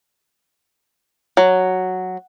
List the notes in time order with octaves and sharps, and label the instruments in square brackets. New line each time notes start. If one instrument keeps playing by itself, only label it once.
[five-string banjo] F#3